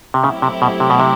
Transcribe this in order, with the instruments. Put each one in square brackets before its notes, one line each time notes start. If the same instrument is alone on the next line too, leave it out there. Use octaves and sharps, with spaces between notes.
[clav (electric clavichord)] C3
[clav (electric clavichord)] C#3 [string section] F#3 A3 C4 E4 G4
[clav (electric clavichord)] C3
B2
C3
B2
C3